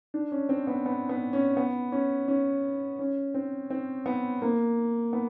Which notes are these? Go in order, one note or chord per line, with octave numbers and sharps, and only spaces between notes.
D4
C#4
C4
B3
B3
B3
C#4
B3
C#4
C#4
C#4
C4
C4
B3
A#3
B3